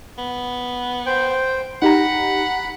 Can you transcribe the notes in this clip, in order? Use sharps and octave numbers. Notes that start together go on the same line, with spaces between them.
B3
C5 G5
D#4 G4 F#5 A#5 B5